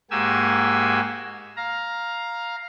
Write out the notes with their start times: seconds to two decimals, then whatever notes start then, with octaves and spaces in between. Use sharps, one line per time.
0.11 G#2 A#3 F#4 G4 G#5 E6
1.57 F5 A#5